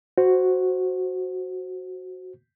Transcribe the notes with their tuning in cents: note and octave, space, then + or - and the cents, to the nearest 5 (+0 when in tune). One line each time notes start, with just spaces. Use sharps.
F#4 +0 C5 +0